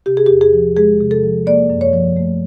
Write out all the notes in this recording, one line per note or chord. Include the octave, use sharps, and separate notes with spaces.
C3 G4
G#4
E2 G4
G#4
F3
G#3 G#4
C3
A4
F3
A#3 D5
F#2
C#5
F3
A3